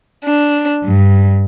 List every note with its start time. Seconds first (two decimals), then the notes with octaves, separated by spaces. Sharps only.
0.24 D4
0.83 G2